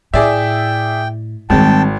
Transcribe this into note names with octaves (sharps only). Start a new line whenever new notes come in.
A2 G#4 D5 E5 G5
G#1 D#3 G3 G#3 C4 G5 A5